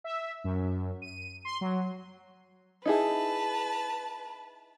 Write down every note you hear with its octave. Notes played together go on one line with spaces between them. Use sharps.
E5
F#2
D#7
C6
F#3
D#4 E4 G#4 B4 A5